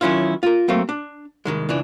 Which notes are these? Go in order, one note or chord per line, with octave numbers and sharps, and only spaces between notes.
D#3 F#3 C#4 E4 F4
F4 A#4
F#3 A3 A#3 C4 F5
D4
C2 G#2 D#3 G#3
C#2 E3 D4